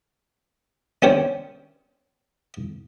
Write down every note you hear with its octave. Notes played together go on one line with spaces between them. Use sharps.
C#4 D4 G4 C5 C#5